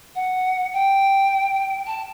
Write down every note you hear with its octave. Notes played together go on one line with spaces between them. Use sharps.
F#5
G5
A5